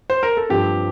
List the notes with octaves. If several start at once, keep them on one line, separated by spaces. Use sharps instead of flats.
C5
A#4
A4
G2 F3 C4 G4